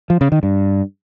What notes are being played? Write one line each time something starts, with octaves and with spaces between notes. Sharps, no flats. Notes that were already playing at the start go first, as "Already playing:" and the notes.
F3
C#3
D#3
G2